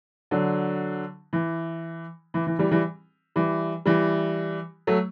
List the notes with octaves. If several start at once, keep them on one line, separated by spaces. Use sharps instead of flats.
D3 F#3
E3
E3
E3
E3 G3
E3 G3
E3 G3
E3 G3
F#3 A3